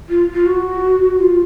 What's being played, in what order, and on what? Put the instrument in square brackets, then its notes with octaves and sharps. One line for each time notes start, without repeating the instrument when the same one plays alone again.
[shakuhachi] F4
F4
F#4
F4